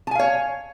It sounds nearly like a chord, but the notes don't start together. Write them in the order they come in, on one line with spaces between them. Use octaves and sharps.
A5 G#5 F5 C#5